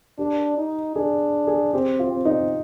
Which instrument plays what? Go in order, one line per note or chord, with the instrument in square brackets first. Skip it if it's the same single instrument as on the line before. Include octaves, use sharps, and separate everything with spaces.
[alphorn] D4 [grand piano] G4
[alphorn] D#4
[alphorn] D4 [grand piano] G#4
[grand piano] G#4
[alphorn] C4 [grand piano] G4
[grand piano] F4
[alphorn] C4
[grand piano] D#4